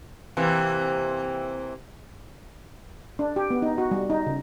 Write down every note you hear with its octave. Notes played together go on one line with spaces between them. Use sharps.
C3 E3 A#3
D4
G4
B3
D#4
F#4
G3
D#4
C#3